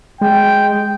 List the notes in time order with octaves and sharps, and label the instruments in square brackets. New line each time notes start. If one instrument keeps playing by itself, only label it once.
[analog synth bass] G#3 [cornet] G5